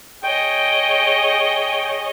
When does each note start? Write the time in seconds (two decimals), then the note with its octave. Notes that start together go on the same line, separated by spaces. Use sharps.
0.23 G#4 C#5 D#5 G5